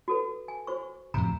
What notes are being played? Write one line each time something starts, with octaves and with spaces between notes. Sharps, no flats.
F#4 A4 B4
G#5
F#4 C5 C#6
F2 A2 C3 A#5